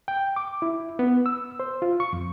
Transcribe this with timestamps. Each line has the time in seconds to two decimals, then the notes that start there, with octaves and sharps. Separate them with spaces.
0.08 G5
0.36 D6
0.62 E4
0.99 B3
1.26 E6
1.60 C5
1.82 F4
2.00 C#6
2.13 F2